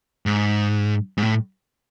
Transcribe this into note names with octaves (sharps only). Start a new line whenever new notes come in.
G#2
G#2
A2